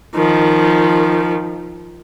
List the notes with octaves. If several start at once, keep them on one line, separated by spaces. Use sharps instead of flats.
D#3 F3